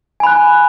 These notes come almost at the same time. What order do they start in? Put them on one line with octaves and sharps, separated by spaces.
G#5 B5 F#6